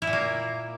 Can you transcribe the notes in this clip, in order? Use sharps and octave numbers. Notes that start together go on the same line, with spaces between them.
E4
A#2
A#3